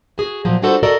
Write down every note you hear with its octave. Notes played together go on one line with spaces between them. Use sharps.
F#4 G#4
A#2 F3 F#3 A5
G3 D4 F4 F#4 A4 C5
F#4 A4 A#4 D5 D#5